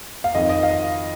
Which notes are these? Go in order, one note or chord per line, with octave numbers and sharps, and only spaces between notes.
F5
F2 D#3 D#5
D#5
F5